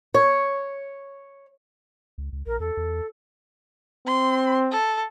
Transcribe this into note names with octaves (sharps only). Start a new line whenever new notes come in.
C#5
C#2
C#2
A#1 A#4
E2 A4
E2
C4 C6
A4